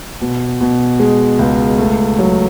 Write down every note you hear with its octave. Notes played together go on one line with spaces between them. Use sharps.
B2
B2
G#3
C#2
A3
F#3